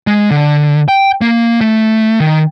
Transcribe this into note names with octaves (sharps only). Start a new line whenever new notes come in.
G#3
D3
G5
A#3
A3
D#3